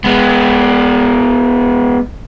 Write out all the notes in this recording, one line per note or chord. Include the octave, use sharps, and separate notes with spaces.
G#3 B3